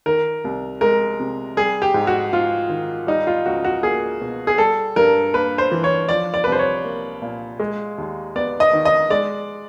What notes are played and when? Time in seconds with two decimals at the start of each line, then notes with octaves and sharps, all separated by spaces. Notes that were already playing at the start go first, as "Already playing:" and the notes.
0.06 D#3 A#4
0.44 C2
0.81 G#3 A#4
1.20 C3
1.57 G3 G#4
1.82 G4
1.94 G#2
2.07 F#4
2.33 G#2 F4
2.69 D#3
3.07 G3 D#4
3.27 F4
3.46 C#2 F#4
3.65 F#4
3.83 A#3 G#4
4.21 B2
4.47 G#4
4.58 G3 A4
4.96 G2 A#4
5.34 A#3 B4
5.58 C5
5.72 E3
5.84 C#5
6.09 F3 D5
6.34 D5
6.44 B4
6.47 C2
6.52 C5
6.59 C#5
6.85 A#3
7.22 A#2
7.59 G#3
7.98 D#2
8.36 B3 D5
8.60 D#5
8.73 D#3
8.85 D#5
9.10 G#3 D5